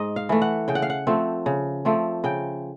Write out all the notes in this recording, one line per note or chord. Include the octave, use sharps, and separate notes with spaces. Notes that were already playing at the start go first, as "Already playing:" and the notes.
Already playing: G#2 D#5
F5
E3 A3
F#5
C#3 G5
F#5
F5
F#5
F3 A3 C4
C#3
F3 A3 C4
C#3 G5